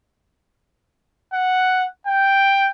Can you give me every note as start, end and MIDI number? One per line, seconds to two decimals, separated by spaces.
1.34 1.86 78
2.07 2.70 79